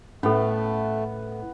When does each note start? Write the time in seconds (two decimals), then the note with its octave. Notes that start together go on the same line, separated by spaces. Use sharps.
0.23 A2 A3 B3 C#4 A4